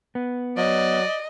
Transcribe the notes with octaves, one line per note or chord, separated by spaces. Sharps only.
B3
F#3 D5 D#5